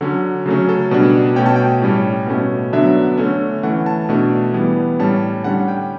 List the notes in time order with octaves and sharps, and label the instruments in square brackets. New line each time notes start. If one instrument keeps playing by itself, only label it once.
[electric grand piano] D3 F#3 C#4
C#3 F#3 A3 C#4
A4
B2 G3 D4
B2 A3 C#4 G5
A5
G5
A2 G3 C#4
B2 A3 C#4
D3 F#3 B3 D4 E5
D3 A3 C#4
E3 A3 C#4 F#5
A5
B2 A3 D4
E3 G3 B3
A2 G3 C#4 A5
D3 G3 C#4 F#5
G5